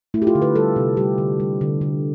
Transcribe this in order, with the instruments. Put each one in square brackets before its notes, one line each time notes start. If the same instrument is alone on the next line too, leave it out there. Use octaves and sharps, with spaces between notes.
[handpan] A3 E4
G4
F4
D3
B4
G3 A4
C3
G3 G4
D3
G3
D3
D3